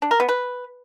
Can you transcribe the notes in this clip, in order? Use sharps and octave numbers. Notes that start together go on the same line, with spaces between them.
D4
A#4
B3
B4